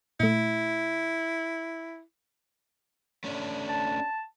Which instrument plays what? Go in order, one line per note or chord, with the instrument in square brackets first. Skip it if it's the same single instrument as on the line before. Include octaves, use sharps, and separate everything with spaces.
[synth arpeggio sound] A#2 A3 [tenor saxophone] E4
[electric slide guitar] A3 C#4 D4
[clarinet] A5